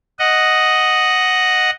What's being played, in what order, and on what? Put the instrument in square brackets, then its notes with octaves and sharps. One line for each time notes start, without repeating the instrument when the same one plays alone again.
[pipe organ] D#5 F#5